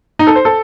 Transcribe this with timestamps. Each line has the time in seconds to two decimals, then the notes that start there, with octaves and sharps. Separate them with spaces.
0.19 D#4
0.27 A4
0.35 C5
0.45 A4